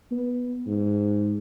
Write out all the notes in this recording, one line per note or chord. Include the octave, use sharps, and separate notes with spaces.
B3
G#2